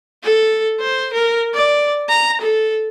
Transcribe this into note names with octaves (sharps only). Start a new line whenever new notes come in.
A4
C5
A#4
D5
A#5
A4